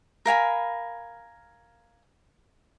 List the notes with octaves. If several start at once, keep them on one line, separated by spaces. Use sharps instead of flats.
A#4 F5 G#5 B5